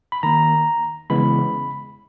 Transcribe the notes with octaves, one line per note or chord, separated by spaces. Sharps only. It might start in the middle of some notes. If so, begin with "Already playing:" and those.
B5
D#3 A#3 A#5
C#3 E3 G#3 B3 B5